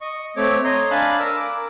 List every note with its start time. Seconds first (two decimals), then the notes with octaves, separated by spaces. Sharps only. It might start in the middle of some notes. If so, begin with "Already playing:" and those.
0.01 D#5 C#6
0.37 A3 C4 C#5 D6
0.64 C#5 D#5 A#5 C6
0.91 D4 F5 G#5 A5 B5 F#6
1.20 A#4 E6
1.37 D6